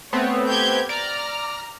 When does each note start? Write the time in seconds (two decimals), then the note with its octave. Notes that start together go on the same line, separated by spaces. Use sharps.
0.13 A3 B3 C4 C#5
0.47 G4 G6 G#6
0.89 D5 A#5 F6